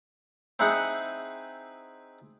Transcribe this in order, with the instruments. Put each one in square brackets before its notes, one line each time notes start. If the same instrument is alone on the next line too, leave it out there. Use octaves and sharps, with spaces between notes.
[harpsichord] C4 D#4 E4 G#4 F#5